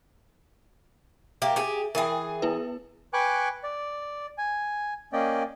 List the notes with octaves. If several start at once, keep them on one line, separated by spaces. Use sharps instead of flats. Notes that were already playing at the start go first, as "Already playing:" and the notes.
A#3 G4 E5
G4 G#4
E3 G#4 A#4 E5 G5
B3 E4 B4
B4 G5 G#5 C#6 D6 F#6
D5
G#5
A#3 C#4 D5 D#5 G5